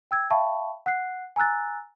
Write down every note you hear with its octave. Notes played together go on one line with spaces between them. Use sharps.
G5 E6 G#6
E5 F5 G5 A5 B5 C#6
F#5 F#6 C7
G#5 A#5 E6 F#6 A6